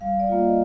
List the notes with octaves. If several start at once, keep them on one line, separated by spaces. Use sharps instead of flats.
G3 F5
D5
A#3 F4
D#5